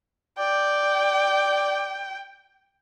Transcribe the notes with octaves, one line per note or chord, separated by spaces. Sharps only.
D5 G5